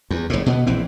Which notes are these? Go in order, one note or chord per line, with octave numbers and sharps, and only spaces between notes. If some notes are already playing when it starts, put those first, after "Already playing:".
E2
F#1 A2
B2 A#3 B3
A#1 E3 C4